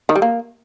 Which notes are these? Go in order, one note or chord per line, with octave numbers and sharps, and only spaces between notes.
D#3
G3
A#3